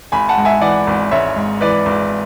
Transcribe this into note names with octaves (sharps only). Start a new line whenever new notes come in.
G#1 G#5 B5
F#5 A5
G#2
E5 G#5
E3 D5 F#5
G#1
G#1 C#5 E5
G#2
E3 B4 D5
G#1